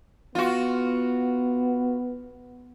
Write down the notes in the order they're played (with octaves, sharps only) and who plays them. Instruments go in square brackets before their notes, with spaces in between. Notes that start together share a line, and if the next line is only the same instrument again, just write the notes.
[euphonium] B3 [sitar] F4 F#4